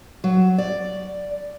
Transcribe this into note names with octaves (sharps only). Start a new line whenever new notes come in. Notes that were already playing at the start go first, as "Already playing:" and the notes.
F#3
D5